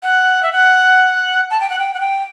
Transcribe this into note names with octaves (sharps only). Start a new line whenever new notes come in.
F#5
E5
F#5
A5
G5
F#5
G5
F#5
G5